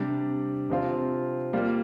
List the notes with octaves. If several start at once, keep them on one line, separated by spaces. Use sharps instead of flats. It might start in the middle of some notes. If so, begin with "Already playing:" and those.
Already playing: C3 G3 D4 G4
C3 F3 C4 F4
G3 A#3 F4